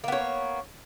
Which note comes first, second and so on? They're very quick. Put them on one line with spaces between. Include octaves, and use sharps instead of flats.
A#3 B3 C#5